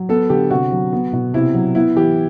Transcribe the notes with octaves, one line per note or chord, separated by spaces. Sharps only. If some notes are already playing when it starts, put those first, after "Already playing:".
Already playing: F#3
B3 A4
D3 G4
C3 F#4
F#3
B3
B2
C3 E4
F#3
B3 E4
E3 G4